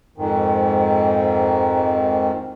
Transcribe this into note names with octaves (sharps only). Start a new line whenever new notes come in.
F2 G#2 D#3